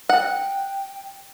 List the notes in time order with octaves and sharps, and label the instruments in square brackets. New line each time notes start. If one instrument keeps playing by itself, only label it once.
[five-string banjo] F#5 [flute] G5